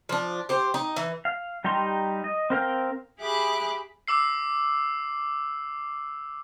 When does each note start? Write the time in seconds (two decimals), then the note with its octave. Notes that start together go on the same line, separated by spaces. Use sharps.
0.09 F3 D4
0.49 G4 C5
0.74 D#4
0.96 E3
1.25 F5
1.64 G3 D#4 G4 A#5 C6
2.24 D#5
2.50 C4 A#4 F5 G5
3.20 G4 G#4 E5 B5 D6 F#6
4.08 D6 E6 C7